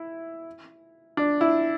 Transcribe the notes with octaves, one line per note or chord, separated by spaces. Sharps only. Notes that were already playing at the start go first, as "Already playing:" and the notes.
Already playing: E4
D4
E4